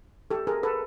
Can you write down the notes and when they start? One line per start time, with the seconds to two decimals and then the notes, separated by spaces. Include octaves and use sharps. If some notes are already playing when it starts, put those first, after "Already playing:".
0.31 G4 A4
0.47 G#4 A#4
0.63 A4 B4